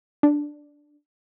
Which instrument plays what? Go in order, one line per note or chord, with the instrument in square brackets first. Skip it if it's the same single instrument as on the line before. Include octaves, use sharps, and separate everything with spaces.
[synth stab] D4